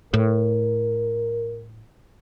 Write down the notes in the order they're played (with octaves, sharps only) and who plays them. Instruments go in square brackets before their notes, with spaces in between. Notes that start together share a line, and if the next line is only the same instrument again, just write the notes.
[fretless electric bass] A2 [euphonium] A#4